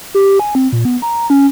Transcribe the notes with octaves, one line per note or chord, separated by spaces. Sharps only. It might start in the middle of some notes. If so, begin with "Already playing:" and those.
G4
G#5
C4
A#2
B3
A#5
C#4